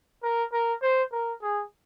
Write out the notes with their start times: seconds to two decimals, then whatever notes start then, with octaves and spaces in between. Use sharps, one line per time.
0.23 A#4
0.52 A#4
0.82 C5
1.12 A#4
1.42 G#4